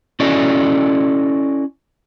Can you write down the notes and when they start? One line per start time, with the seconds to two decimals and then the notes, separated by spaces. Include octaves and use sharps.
0.20 C#4 E4 F#4 A4 D5 D#5